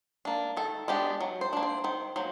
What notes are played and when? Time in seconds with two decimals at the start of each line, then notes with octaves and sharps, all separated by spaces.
0.25 A#3 D4
0.57 D#3 A4
0.88 G#3 B3 D4 G4
1.21 F#3
1.41 C5
1.53 A#3 D4
1.63 C5
1.84 D#3 C5
2.16 F#3 A#3 C5